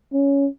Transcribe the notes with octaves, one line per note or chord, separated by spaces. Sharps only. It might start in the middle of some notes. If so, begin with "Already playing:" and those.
C#4